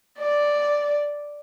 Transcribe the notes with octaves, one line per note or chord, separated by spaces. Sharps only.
D5